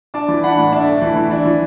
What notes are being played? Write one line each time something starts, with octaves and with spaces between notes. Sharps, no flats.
D4 A5 D6
E3
D4 F#5 B5
A2
D4 E5 A5
A2
E3
E3
D4
E3